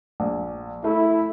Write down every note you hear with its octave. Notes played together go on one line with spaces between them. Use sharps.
A#1
A3 E4